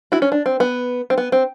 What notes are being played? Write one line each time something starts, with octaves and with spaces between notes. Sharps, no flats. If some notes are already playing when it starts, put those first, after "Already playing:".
E4 F#4
C#4
D4
C4
B3
C4
B3
C4